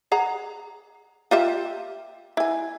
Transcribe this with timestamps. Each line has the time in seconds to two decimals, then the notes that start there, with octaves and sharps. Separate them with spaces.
0.12 G#4 F#5 A#5
1.31 F4 G4 E5
2.37 E4 G#5